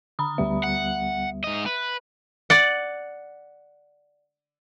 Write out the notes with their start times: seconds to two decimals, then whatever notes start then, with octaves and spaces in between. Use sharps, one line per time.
0.19 D3 A#5 B5 D#6
0.38 D2 G3 B3 E5
0.64 F#5
1.44 G#2 D#5
1.66 B4
2.50 D5 F#5